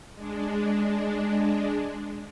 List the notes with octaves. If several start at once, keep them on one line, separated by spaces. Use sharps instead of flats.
G#3 D4